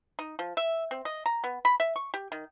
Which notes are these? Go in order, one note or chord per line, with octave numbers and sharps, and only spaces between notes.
D#4
F3
E5
C4
D#5
A#5
B3
B5
E5
C#6
G4
D#3